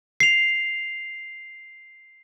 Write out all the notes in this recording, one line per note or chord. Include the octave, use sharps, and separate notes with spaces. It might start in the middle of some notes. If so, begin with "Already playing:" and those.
C7 F7